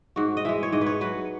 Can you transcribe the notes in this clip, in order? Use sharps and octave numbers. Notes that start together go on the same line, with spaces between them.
G#2 F#4
D#5
E3 G#3 E5
C#5
G#2 D#5
B4
C#5
F#3 B4